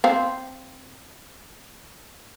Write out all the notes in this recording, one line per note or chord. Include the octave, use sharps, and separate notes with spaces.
C4 F5